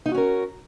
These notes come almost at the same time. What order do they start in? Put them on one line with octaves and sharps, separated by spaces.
D#4 F4 F#4 C#4 A#4